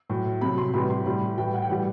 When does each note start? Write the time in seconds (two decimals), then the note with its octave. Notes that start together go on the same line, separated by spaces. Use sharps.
0.10 A2 F#3
0.41 C3 F#3 B5
0.58 C6
0.73 A2 E3 G3 B5
0.90 C6
1.06 A2 G3 B5
1.38 A2 E3 G3 G5
1.54 F#5
1.62 G5
1.69 A2 E3 G3 F#5